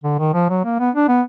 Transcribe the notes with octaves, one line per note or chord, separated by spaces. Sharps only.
D3
D#3
F3
F#3
A#3
B3
D4
B3